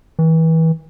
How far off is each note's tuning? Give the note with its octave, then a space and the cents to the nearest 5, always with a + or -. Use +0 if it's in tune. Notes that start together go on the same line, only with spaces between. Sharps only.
E3 -30